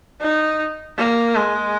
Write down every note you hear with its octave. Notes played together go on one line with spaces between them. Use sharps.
D#4
A#3
G#3